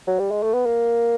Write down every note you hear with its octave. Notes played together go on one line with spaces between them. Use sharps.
F#3
G3
G#3
A3
B3
A#3